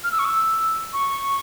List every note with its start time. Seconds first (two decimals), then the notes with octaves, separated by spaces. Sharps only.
0.04 F6
0.12 E6
0.19 C#6
0.25 E6
0.93 C#6